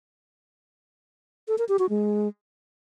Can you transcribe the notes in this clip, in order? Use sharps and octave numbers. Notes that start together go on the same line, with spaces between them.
A4
A#4
G4
F#4
G#3